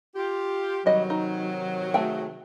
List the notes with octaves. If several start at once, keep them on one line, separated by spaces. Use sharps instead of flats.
F4 G4
C3 D#3 F#3 G3 D#5
D#4
A3 G#4 G5